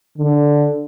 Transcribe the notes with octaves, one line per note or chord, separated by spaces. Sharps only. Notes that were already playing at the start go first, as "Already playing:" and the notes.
D3